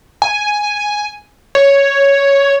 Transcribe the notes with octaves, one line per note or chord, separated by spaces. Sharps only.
G#5
C#5